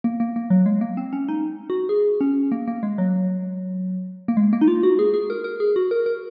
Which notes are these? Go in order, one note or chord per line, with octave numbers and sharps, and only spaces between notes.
A#3
A#3
A#3
F#3
G#3
A#3
C4
C#4
D#4
F#4
G#4
C#4
A#3
A#3
G#3
F#3
A#3
G#3
A#3
D#4
F4
F#4
G#4
G#4
A#4
A#4
G#4
F#4
A#4
A#4